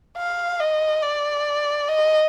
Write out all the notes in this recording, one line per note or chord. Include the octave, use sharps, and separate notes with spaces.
F5
D#5
D5
D#5